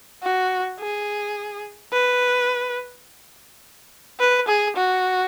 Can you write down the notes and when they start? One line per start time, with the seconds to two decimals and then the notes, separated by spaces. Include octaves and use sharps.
0.23 F#4
0.80 G#4
1.93 B4
4.20 B4
4.48 G#4
4.77 F#4